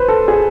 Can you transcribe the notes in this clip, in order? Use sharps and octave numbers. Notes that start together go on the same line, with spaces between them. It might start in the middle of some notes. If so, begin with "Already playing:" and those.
Already playing: B4 C5
A4
G#4